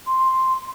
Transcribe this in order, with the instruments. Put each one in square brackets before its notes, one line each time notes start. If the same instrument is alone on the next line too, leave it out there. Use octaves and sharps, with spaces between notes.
[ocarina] C6